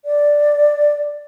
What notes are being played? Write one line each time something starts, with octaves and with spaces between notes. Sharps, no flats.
D5